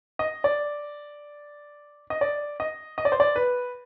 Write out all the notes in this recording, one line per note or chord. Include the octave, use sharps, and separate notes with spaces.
D#5
D5
D#5
D5
D#5
D#5
D5
C5
D5
B4